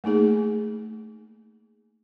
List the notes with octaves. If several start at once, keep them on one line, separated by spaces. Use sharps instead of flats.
A3 A#3 D#4 G#4